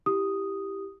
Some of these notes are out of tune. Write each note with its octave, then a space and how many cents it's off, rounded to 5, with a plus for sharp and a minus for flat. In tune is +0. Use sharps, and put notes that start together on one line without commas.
E4 +0 G4 +0 D#6 +0